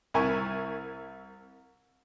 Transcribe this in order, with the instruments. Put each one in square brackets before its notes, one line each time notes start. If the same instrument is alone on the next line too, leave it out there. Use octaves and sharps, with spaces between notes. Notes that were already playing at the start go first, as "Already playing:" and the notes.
[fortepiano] C2 E4 A#4 G#5 C#6